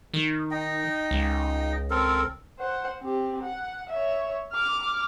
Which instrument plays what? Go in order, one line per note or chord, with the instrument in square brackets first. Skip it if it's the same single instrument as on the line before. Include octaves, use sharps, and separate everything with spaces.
[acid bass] D#3
[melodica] D#4 D#5 G5
[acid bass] C#2
[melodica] C4 A4 A#4
[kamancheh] C5 F#5
C4 G4
F#5
C#5 E5
D6 F6